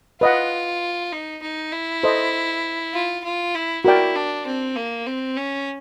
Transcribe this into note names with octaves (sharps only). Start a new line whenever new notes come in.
F4 B4 D#5 F#5
D#4
D#4
E4
A4 C5 D#5
F4
F4
E4
E4 F#4 A#4 D5 G5
D4
C4
A#3
C4
C#4